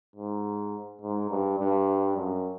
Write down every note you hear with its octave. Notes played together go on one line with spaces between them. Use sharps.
G#2
G#2
G2
G2
F#2